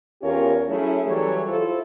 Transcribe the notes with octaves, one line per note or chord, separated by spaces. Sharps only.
E2 C#4 F4 G4 A#4 C#5
F#3 A3 C#4 E4 G#4
E3 F#3 G3 G#4 A4 C#5
E4 F4 A4 C5